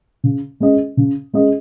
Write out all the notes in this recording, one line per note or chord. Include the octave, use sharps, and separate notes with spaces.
C#3
G#3 C#4 G#4 D#5
C#3
G#3 C#4 G#4 D#5